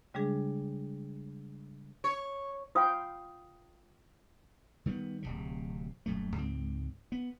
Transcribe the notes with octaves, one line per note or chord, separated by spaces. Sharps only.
C#3 G3 G#3 D4 G#4
C#5
F4 C5 F5 G5 D#6
D#3 G3 G#3 B3
D1 G1 C3
D#1 F#2 A3
C#2 G#2 C4
B3